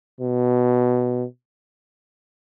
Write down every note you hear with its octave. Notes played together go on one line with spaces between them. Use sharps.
B2